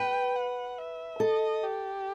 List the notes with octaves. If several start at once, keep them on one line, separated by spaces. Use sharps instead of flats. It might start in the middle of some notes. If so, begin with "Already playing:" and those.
Already playing: B4 G5
F#5
E5
A4 D#5
G4